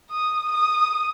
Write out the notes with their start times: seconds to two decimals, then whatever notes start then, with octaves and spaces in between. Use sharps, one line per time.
0.10 D#6
0.50 D#6